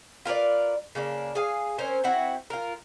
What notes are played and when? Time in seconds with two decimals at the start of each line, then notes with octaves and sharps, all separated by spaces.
0.25 F4 A#4 B4 D5
0.95 C#3 A#3 D4
1.35 G#4 F5 G#5
1.78 C4 C#4 A#4 C5
2.04 C4 E4 F#4
2.50 F4 A#4